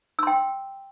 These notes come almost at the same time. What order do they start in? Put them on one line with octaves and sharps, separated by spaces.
E6 C6 G5